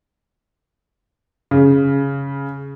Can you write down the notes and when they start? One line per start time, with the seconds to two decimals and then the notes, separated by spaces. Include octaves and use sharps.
1.51 C#3